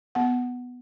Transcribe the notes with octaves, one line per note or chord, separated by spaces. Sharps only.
B3 F#5